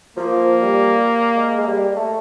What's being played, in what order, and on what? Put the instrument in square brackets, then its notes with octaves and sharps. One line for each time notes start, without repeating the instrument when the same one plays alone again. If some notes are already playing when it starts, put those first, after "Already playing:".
[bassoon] F3 [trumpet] A#3
[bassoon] G3
G#3
G#3
G3
A3